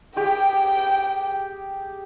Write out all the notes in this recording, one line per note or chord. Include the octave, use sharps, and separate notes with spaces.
G4 G#4 G5